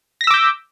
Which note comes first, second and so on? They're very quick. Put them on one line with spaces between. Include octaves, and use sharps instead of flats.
A#6 B6 E6 D6 G6